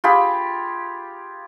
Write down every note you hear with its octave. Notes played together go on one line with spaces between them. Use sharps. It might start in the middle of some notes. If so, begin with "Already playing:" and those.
F4 G4 G#4 B5